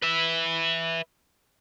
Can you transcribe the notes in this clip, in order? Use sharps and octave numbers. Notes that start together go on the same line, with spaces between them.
B4 E5